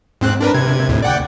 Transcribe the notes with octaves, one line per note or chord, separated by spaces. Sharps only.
G#2 C4 F#6
D4 A#4 B4
C3 G#6
D2 A2
D5 F#5 G5